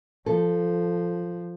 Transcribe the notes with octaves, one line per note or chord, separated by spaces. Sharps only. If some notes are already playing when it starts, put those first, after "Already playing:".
F3 A4